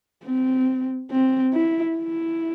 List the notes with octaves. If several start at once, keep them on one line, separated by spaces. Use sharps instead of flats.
C4
C4
E4
E4